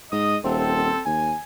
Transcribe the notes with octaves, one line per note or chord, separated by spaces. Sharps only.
G#2 D#5 D#6
D#1 C4 A4
D#2 G#5